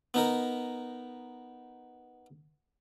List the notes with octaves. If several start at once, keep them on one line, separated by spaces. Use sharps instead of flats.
B3 D#4 A#4